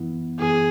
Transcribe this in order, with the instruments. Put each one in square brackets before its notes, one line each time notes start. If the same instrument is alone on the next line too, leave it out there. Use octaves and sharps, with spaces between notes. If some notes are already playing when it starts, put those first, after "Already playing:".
Already playing: [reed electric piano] F#2 E3 B3 E4
[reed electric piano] F#2 E3 B3 E4 [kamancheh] G#4